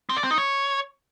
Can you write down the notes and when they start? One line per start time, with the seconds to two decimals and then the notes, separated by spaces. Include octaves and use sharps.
0.09 C4
0.17 D5
0.24 C4
0.31 D#4
0.38 C#5